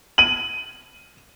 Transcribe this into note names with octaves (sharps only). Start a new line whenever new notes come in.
D#7 F#7